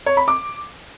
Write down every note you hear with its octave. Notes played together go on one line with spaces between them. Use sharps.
C#5
B5
D6